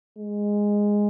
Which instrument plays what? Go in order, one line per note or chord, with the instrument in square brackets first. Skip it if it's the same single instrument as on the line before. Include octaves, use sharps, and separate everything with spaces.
[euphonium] G#3